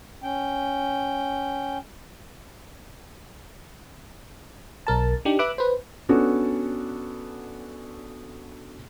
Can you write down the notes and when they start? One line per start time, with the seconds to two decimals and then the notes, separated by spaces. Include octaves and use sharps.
0.23 C#4 G5
4.87 B1 A#4 A5
5.25 D4 D#4 G4
5.39 B4 E5 B5 D6 E6 F#6
5.58 B4 C5
6.09 B3 C#4 D4 F#4 A4